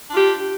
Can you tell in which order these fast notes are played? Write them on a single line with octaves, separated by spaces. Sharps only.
D4 F4 G4